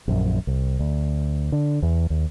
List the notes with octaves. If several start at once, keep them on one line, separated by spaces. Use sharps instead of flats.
A#1 F#2
C2
D2
D3
E2
D#2